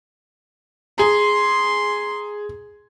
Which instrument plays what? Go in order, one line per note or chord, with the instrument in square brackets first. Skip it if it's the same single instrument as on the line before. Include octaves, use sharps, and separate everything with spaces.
[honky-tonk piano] G#4 A#5 [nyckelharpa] C6